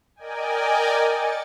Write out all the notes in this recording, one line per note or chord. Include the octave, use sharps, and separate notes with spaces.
A#4 D5 D#5 G5 G#5
A6 C#7